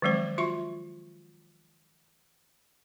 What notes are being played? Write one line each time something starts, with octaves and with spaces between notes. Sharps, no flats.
D#3 F3 F#3 G#3 C4 C5
F4 F#4 E5 C6 C#6